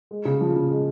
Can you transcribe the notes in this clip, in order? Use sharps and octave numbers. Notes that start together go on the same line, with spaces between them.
G#3
C#3
F3
C#3
G#3